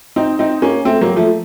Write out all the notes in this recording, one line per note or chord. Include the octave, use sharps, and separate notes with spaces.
C4 D#4
C4 D#4
A#3 C#4
A3 C4
F#3 A#3
F3 A3